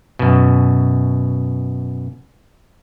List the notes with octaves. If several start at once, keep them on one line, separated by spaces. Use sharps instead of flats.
F#2 B2